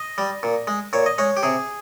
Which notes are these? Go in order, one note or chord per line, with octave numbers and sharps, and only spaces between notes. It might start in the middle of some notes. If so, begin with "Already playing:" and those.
Already playing: D#5
G3
A#2
G#3
A#2 C#5
D#5
G#3 C#5
G4
C3 G#4